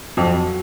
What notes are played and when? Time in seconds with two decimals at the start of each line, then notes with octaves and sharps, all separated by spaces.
0.17 F2 F#3